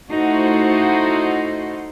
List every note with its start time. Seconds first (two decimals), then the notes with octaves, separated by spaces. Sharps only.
0.10 A3 D#4 E4 F#4 C5